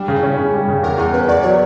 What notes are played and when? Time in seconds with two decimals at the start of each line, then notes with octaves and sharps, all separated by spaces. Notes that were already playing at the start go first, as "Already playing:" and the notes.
Already playing: G3 D4
0.08 C#3
0.16 E4
0.23 C#4
0.38 C#3
0.54 G3
0.68 C#3
0.83 E2 A#4
0.98 E2 A#4
1.13 C#4 B4
1.28 E2 D5
1.43 F#3 C#5